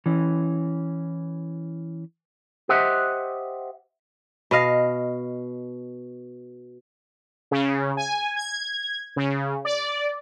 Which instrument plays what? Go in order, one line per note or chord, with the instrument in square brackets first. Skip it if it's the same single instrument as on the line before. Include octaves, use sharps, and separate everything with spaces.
[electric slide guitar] E3 C#4
[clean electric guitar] G4 C5 D#5 E5 F#5
[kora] B2 D#5 F5
[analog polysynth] C#3
G#5
G#6
C#3
D5